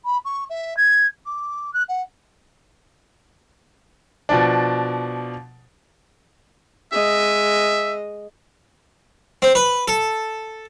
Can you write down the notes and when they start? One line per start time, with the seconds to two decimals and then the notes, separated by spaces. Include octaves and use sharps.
0.05 B5
0.25 C#6
0.49 E5
0.76 G#6
1.25 D6
1.73 F#6
1.88 F#5
4.29 B2 F3 D4
6.93 G#3 D#5 E5
9.42 C4
9.55 B4
9.88 A4